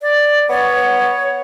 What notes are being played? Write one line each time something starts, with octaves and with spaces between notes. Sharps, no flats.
D5
B3 C#5